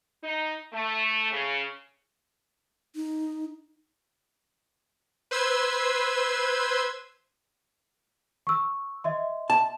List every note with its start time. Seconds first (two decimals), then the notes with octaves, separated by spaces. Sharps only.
0.24 D#4
0.73 A3
1.32 C#3
2.96 D#4
5.31 B4 C5 C6 E6 G#6
8.47 C#6 E6
9.04 D#5 E5 C6
9.50 A5